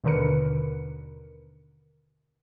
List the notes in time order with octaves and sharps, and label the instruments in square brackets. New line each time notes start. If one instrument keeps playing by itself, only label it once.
[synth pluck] D#2 B2 D3 A#4 B4 C#7